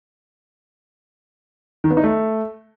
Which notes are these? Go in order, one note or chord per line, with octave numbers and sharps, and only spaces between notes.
D#3
B3
D#4
A3